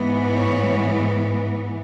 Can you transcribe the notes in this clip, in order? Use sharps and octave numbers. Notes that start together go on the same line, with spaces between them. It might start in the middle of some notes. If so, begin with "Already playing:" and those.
Already playing: G#2 E3 B3
C#5